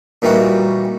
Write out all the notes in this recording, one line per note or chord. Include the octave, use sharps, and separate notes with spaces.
A#2 D#3 E3 G3 D#4 F#4